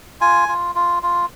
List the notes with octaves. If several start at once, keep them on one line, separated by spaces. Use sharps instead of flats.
F4 G#5
F4
F4
F4